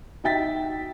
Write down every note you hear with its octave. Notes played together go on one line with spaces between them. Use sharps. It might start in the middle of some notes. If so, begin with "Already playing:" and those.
D#4 F#4 E5 G5 A6 B6